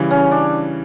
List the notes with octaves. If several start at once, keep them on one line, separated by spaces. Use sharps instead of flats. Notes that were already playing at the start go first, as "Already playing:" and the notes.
Already playing: C#3 E3 G3
C#4
D4